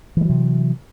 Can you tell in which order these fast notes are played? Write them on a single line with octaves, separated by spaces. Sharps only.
E3 G#3 F#3 C3